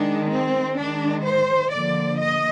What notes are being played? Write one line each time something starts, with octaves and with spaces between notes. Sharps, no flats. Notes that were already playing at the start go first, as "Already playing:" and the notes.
Already playing: D#3 G#3 D4
C4
D#3 G#3 D4
C5
D3 F3 A#3 D5
D#5